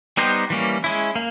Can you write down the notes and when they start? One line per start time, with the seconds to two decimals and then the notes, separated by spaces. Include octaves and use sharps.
0.17 G3 B3 D#4 G4 C5
0.50 E3 G3 A#3 C#4
0.84 G#3 C#4 E4
1.16 A#3